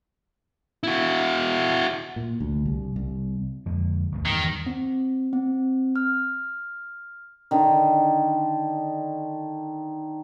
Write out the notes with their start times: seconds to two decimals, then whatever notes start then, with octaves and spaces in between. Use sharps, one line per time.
0.83 E4 F#4
2.16 A#2
2.40 D2
2.66 C2
2.96 C2
3.66 F2 D3 G#3
4.12 G1 D2 B2
4.26 E2 G2 D#3
4.66 C4
5.33 C4
5.96 F6
7.51 D3 D#3